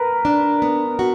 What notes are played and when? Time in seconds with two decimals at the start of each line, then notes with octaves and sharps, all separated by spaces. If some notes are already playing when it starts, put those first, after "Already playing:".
Already playing: A#4 B4
0.25 D4
0.62 B3
0.99 F#4